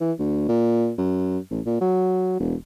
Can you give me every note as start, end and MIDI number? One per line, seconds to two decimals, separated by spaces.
0.01 0.12 52
0.19 0.47 38
0.49 0.92 46
0.98 1.38 42
1.51 1.60 33
1.66 1.80 46
1.81 2.38 54
2.39 2.55 28